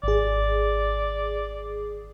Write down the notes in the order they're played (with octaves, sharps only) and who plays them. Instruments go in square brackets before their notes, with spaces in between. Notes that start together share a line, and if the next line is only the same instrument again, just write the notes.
[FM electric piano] G#1 G#4 [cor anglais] D5